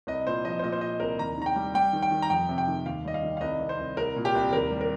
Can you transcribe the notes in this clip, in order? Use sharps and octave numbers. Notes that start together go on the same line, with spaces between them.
C2 D#5
A#2 C5
F3 D#5
C5
A#2 D#5
C5
A#2 D#5
C2 A#4
D#2 A#5
D#3 A#5
G5
G3
G3 G5
D#3
G5
D#3
A#5
F2 G5
C3
G5
D#3
D#2 F5
G3 D#5
F5
D#3
F5
C2 D#5
C2
C5
C2
C2 A#4
A#2
G4
C2
D#2 A#4
G3
A#4